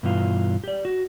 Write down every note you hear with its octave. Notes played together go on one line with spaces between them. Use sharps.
G2 B2 E3 F4
G4 D5
F#4